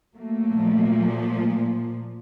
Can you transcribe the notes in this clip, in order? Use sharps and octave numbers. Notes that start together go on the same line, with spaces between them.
F#3 A3 A#3
A#2 F3